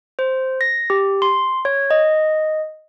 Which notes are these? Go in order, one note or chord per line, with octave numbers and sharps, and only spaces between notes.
C5
A#6
G4
C6
C#5
D#5